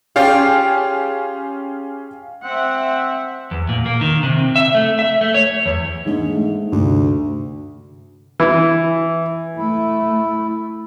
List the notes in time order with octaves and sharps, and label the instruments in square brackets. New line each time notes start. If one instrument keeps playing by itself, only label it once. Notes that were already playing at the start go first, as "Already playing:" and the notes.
[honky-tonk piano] C#4 G#4 F5 [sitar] F4 G4
[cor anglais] C4 [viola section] E5 F#5
[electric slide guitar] E2
A#2
A#3
D#3
C3
E5
A3
E5
A3
C#5
E2
[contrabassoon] G#2 [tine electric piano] E3 A#3 D4
[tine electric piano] A3
[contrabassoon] D2 [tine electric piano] G2 C3
[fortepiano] E3
[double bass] A3 [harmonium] E4